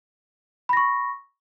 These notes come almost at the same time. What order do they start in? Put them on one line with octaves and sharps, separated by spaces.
B5 A#6 C#6